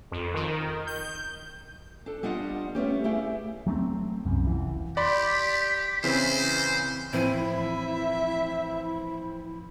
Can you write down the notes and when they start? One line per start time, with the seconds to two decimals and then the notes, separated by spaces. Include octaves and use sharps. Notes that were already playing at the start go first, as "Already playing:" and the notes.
0.12 F2
0.34 D#3
0.87 G6
2.06 D4 A4
2.23 G3 B3 D4 F4 D#5 F#5
2.75 A3 B3 C#4 G4
3.04 A3 E4 G4 G#4 F5
3.67 F#3 A3 B3 C4
4.26 C2 F#2
4.47 F1 E3
4.97 G4 D5 B5 C6 B6
6.04 C#3 E3 C4 C5
7.13 A2 E3 F3 C4 E4 E5 D#7